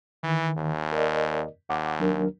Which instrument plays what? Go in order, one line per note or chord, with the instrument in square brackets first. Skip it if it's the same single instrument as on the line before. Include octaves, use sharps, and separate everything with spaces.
[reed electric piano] D#3 [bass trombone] E3
[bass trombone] D#2
[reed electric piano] A#4 D5 D#5
[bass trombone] D#2 [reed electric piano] F#5 D6
[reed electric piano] F#3 D4 A#4